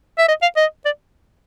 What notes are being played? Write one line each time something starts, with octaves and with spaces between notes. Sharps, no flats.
E5
D#5
F5
D#5
D5